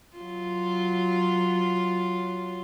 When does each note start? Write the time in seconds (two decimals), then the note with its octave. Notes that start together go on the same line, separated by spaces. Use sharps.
0.16 F#3 F4